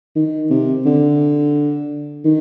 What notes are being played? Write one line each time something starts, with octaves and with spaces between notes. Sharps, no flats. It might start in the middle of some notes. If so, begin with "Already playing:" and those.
D#3
C3
D3
D#3